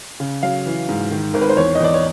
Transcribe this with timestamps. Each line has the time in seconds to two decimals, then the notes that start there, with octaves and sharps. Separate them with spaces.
0.20 C#3
0.43 F#3 F5
0.66 E3
0.89 G#2
1.11 D#3
1.34 G#1 A#4
1.41 B4
1.49 C5
1.57 E2 C#5
1.75 D#5
1.80 E2 D5
1.94 C#5